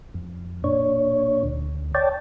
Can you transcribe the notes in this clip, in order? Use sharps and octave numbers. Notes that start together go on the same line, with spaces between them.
F2
A#2 D4 C#5
D2
C#5 D5 G5 A5